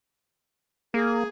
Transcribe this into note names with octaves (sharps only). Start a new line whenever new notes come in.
A#3 G#4